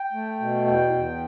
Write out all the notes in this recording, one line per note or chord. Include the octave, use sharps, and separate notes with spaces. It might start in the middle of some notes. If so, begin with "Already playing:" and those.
Already playing: G5
A3
B2
E2 G5
E2